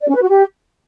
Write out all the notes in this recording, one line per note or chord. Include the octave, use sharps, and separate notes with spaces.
D5
C#4
B4
F#4
G4